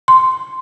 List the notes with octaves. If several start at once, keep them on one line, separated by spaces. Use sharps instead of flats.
C6